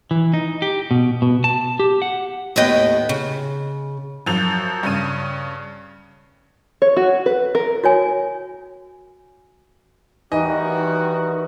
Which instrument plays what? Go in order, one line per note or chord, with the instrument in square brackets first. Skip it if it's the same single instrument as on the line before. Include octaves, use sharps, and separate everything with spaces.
[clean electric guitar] E3
D#4
G4
B2
B2
A5
G4
F#5
[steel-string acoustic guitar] D#2 A2 B3 D#5 G5
C#3
[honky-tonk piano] F#2 F3 F7
G2 C#3 D#7
[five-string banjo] C#5
F#4
B4
A#4
[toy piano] F#4 C#5 G#5
[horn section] D#3 G3 F#4 [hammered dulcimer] E3 [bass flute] D#4 [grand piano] D#5